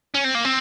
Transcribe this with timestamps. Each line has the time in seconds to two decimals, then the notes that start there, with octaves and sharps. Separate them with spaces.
0.15 C#4
0.25 C4
0.35 A#3
0.45 C4